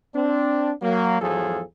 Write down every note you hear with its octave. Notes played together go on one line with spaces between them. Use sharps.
C4 D4
F#3 A#3
E2 G#2 F3 F#3 G#4 A4